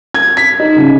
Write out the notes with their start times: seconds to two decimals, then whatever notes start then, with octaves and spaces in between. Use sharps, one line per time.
0.14 G#6
0.37 B6
0.60 D#4
0.76 C#3